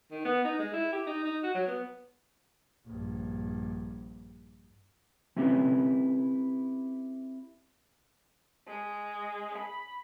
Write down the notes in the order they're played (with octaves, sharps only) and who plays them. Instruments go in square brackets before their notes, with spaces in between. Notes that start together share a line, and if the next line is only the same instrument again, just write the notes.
[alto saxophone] D#3
B3
D#4
G#3
E4
G4
D#4
D#4
F#4
F#3
B3
[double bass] A#1 G2
[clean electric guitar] C4 C#4 E4 G4 B4
[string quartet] G#3
B5